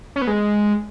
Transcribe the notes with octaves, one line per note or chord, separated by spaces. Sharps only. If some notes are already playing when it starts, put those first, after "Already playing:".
C#4
B3
G#3